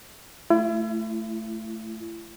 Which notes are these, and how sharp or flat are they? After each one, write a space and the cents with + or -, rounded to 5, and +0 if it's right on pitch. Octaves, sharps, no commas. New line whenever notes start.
A3 +0 E4 +40